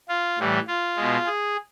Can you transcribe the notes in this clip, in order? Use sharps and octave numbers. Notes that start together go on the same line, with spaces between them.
F4
A2 E3 G3
F4
B2 G#3
G#4